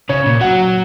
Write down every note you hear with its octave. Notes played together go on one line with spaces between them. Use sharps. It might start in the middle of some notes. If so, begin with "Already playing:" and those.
C#3 C#5
A#2
F#3 F#5